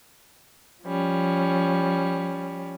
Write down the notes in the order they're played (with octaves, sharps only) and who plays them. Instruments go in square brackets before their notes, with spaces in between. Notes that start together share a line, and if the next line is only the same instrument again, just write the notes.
[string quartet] F3 G3 C#4